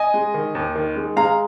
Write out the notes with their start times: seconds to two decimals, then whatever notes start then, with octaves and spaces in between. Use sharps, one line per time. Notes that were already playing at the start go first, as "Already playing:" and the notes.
Already playing: D#5 G#5
0.14 G#3
0.34 D#3
0.55 D#2
0.75 D#3
0.96 G#3
1.16 G#3 F5 A#5